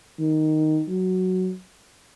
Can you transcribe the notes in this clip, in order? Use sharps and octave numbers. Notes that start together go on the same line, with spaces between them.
D#3
F#3